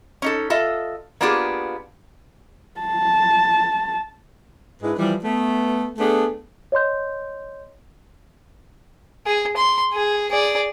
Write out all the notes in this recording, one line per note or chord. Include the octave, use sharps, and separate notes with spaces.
C#4 D#4 A4
F4 A4 D#5 E5
A#3 B3 D4 F4 G4 G#4
A5
G#2 G#3 D4 E4 B4
E3 F3 G3
A3 B3
A3 B3 D4 G#4 A4
C#5 D#5 C6 G6
G#4
C6
G#4
G#4 D5